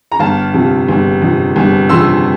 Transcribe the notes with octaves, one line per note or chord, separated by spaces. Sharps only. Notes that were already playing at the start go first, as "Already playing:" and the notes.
A#5
G1 F5 A5
F2 C3
G1
F2 C3
G1
F2 C3 C6 E6